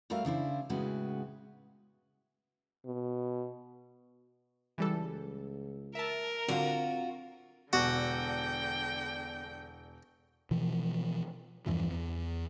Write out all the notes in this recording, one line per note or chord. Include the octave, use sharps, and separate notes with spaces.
G3 A3 F#4 A4 A#4 F5
C#3 D4 E4 C5
A2 C#3 G#3 B3 F#4
B2
C#2 E3 G3 A4
A#4 E5 A5
D3 C4 F4 F#4
E1 D3 B3 F#4 D5 G5 D6
B2 E3 F3
E2 G2 E3 F3
E2